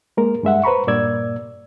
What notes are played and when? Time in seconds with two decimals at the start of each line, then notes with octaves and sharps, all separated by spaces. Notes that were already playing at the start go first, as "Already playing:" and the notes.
0.17 G#3 A#3 A#4
0.43 G2 G#3 E5 F#5
0.64 B4 C5 A#5 B5 C#6
0.87 G2 A#2 A#3 D5 E6 G#6